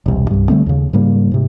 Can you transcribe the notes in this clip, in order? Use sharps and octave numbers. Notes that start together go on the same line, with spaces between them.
E1 C2
C2 G2
D3 G3 A3 C4
D#2 C#3
G#2 C#3 G3 A#3
G#2 C3